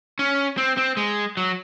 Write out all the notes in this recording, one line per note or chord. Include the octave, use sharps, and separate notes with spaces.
C#4
C4
C4
G#3
F#3